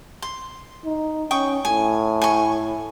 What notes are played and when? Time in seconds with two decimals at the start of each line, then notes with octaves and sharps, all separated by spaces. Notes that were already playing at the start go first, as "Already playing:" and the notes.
0.22 C6
0.85 D#4
1.31 C#4 G5 C#6 D#6
1.65 A2 G#5
2.22 G#5 C#6